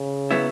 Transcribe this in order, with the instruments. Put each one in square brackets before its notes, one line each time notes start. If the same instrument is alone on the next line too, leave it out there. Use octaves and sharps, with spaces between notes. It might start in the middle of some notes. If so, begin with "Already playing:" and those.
Already playing: [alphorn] C#3
[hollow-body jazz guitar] F#3 B3 E4